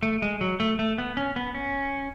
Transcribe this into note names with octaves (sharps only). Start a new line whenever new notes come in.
A3
G#3
F#3
A3
A3
B3
C#4
B3
C#4